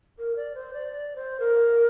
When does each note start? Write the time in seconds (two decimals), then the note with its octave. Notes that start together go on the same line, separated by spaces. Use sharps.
0.18 A#4
0.36 D5
0.55 C5
0.73 D5
0.91 D5
1.16 C5
1.40 A#4